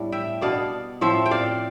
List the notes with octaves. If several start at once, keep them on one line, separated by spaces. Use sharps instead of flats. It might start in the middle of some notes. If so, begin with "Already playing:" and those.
Already playing: A2 G3 B3 D4
E5 G5
B2 B3 D4 D5 F5
A2 F3 C4 C5 E5
G5
D5 F5